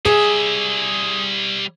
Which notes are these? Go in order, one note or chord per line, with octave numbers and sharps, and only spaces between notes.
G3 G#4 E5